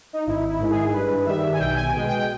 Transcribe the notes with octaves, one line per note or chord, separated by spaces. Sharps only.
D#4
G#1 E4
E4
G#2 D#3 G#3
G#4
G2 B4
D#3 G3 E5
G#5
B1 G5
G#5
B2 G#3 G5
G5